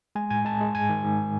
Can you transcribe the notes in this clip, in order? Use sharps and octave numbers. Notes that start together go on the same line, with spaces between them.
G#3 G#5
A2 G#5
G#3 A5
G#3
G#2 G#5
D#3
G#2